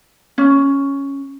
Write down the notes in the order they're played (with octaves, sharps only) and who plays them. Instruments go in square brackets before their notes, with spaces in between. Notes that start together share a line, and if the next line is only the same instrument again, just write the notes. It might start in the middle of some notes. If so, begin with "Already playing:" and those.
[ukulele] C#4